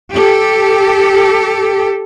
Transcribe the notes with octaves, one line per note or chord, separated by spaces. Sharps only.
G4 A4